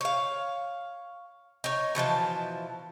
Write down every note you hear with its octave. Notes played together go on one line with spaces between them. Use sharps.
C#5 F5
D#4 C#5
B2 E3 F3 A5